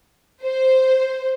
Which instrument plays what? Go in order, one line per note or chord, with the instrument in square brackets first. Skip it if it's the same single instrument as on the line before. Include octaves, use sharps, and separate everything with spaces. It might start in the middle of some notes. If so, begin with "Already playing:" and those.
[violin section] C5